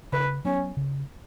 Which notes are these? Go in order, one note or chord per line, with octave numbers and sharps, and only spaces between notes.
C#3 B4
F#3 B3 C#4
C#3